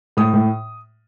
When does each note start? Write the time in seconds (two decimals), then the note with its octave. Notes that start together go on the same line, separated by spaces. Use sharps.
0.17 A2 D#6
0.33 A2